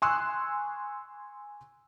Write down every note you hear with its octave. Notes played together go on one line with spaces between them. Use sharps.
G#5 C6 C#6 D#6 E6 F#6